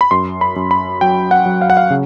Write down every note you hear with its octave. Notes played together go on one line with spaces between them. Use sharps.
B5
F#2 C6
B5
F#2
B5
F#3 G5
F#5
F#3
F5
F#5
F5
C#3